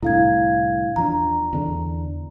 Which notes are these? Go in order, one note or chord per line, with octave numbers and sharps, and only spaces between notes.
C2 A2 D3 E4 F5 G#6
E2 F3 D4 A#5
E2 D3 D4